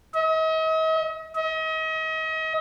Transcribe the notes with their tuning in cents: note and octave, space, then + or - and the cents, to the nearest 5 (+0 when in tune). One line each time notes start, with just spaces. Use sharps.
D#5 +45
D#5 +40